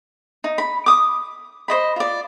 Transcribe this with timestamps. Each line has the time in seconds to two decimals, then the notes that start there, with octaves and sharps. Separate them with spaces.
0.44 D#4
0.58 B5
0.86 D6 D#6
1.68 C5 D#5 B5
1.96 F4 D5